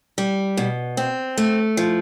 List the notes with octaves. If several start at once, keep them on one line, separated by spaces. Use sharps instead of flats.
G3
B2
C4
A3
F3